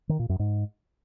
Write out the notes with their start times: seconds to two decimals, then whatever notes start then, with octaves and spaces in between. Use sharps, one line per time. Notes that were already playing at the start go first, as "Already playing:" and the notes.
0.09 D#3
0.19 A#2
0.29 F#2
0.39 G#2